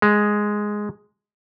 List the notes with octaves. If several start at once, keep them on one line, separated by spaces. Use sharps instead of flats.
G#3